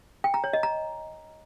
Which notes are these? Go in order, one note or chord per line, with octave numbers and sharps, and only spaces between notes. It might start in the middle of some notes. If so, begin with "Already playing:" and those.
G5
A#5
C#5
D#5
A#5